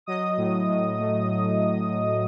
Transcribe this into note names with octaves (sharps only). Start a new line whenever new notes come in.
F#3 D#5 D#6
A2
A2
A3